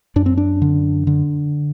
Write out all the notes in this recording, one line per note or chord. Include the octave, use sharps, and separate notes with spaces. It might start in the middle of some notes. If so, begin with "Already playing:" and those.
F#2 D4
C4
D4
D3
D3